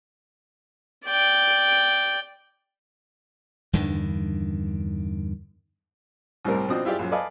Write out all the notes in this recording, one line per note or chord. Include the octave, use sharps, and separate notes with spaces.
D5 G5
E2 G2 D3 D#3
C2 A2 G3 C4 A#4
B2 F3 C4 D4 D#6
E4 F4 G4 G#4 D5
A#1 F#2
A4 B4 D5 D#5 F5 G#5